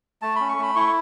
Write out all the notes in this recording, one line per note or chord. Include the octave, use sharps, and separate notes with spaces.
A3 A5
C#4 B5
C#6
A3 B5
E4 C#6